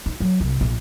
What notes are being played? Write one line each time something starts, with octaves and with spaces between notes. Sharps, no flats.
D#4
F#3
C2
A#1